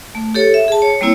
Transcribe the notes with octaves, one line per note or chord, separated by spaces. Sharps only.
A3
G4 A4 C#5
E5
G#4 A5
C#5
G3 A#3 C4 E4 C#5